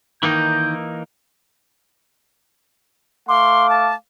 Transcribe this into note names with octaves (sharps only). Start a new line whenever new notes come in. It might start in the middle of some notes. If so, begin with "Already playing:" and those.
D#3 E3 A#3 D#4 G6
A3 F5 C6 D6
A5